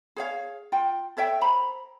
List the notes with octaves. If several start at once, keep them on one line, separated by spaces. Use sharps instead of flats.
G#4 C#5 F5
F4 G5
A4 C#5 E5 G5
C5 A#5 B5